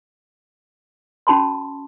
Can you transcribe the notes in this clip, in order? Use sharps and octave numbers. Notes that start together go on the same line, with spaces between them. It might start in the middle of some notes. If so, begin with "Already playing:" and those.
C#4 F#4 A5 B5 C6